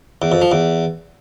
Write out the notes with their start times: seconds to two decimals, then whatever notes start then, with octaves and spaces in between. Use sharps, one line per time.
0.22 E2
0.32 F2
0.42 F3
0.52 E2